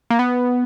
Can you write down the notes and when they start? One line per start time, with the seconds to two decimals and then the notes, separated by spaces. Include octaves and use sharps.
0.10 A#3
0.19 B3